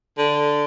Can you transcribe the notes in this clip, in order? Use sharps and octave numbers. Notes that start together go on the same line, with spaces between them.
D3